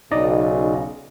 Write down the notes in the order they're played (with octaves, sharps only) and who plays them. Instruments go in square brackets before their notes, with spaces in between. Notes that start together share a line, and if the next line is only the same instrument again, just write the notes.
[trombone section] B1 C#3 [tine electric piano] D#4 D5 D#5